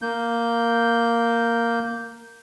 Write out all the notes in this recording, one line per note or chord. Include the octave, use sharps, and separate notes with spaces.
A#3 G6